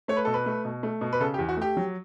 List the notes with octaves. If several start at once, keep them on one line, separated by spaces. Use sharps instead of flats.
A3 C#5
B4
B2 A4
B4
A3
B2
A3
B2
B4
C#3 A4
G4
E2
F#4
A3 G4
F#3